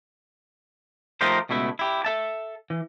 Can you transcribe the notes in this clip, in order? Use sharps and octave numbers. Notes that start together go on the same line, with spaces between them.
F3 A3 D#4 G4 A#4 C5
C#2 B2 A3 E4 E5
E4 G4
A4 E5 A5
E3